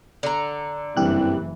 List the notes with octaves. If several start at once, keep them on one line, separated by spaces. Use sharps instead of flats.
D3 A#5
F#1 C2 G2 E3 G4 F#6